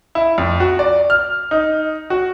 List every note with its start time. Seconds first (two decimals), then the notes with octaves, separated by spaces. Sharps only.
0.15 E4
0.38 F2
0.60 F#4
0.79 D5
1.10 F6
1.51 D#4
2.10 F#4